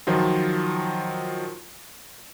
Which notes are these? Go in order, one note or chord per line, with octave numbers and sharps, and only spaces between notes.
D#3 F3 F#3 F4